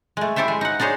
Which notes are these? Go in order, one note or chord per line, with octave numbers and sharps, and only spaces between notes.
G#3 A3
E4 G4 A4 C5 E5
G#3
D#4 F#5
D4 D#4 G#4 C5 C#5